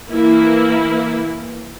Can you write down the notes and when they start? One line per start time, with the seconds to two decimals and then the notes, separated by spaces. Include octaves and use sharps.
0.11 E3 A#3 E4